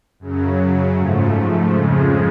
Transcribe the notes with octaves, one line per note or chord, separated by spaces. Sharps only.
F#2 C#3 F#3
G#2 F3 A3
F2 C#3 F3 G#3